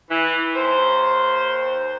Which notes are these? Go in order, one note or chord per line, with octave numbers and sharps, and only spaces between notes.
E3
D#2 C5